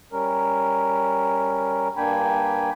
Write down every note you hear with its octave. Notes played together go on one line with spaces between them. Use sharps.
G3 C#4 A#4
G2 A#3 D4 G5 G#5 B5